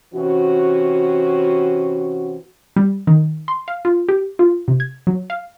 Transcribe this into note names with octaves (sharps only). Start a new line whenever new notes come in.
C3 E3 C#4 F#4
G3
D#3
C6
F5
F4
G4
F4
C3
G#6
F#3
F5